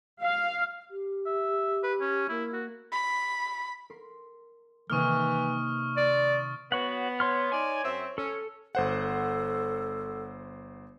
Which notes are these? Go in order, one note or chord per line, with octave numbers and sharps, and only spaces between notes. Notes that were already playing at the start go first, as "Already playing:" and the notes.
F5
G4
E5
B4
C#4
A#3 E4
F#4
B5
A#4 C6
C3 D#3 E3 A#3 C#6 D#6 F6
D5 C6 F#6 A6
B3 F#4 C#5 F#5
C#5 C6 F6
D#4 D5 G#5
F#2 C4 E5
C#4 A4
G1 A4 C5 F#5